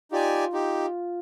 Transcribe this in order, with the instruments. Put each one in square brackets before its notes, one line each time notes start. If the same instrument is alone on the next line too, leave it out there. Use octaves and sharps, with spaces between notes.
[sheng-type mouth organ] D#4 G4 D5 G#5 [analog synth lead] F4
[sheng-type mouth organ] D#4 G4